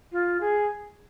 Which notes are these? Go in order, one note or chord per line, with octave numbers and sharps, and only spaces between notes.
F4
G#4